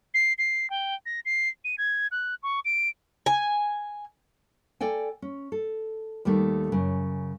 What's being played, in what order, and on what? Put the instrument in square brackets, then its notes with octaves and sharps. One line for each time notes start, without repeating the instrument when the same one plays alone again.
[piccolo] C7
C7
G5
A#6
C7
D#7
G#6
F#6
C#6
D7
[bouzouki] G#5
[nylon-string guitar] A4 D5 G5 G#5
C#4
A4
D#2 D#3 G3 A3
F#2 C#3